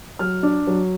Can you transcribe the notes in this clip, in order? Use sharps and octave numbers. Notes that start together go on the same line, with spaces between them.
F#3 F6
D4
F#3